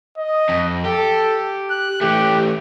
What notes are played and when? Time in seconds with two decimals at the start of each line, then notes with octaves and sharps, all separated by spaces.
0.18 D#5
0.49 F2
0.85 G4 A4
1.70 F#6
2.01 E3 A3 G4